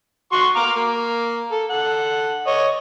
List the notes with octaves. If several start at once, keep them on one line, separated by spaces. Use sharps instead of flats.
F#4 C6 C#6
F5 A#5 D6
A#3
A4
A4 F#5
C#5 D#5